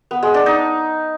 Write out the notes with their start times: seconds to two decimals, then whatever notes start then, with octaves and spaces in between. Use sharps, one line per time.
0.11 B3
0.23 G#3
0.34 D4
0.46 D#4